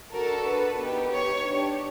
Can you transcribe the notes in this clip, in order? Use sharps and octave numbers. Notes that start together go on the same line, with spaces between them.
D4 F#4 A4 A#4
B4
B3 D#4 G4
C#5
D4 G4